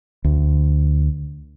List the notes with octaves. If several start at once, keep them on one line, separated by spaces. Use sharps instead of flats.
D2